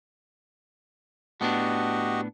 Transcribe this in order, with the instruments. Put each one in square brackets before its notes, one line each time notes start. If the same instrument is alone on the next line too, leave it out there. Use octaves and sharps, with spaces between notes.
[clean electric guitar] A2 B3 D4 [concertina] F#4 G4 D#5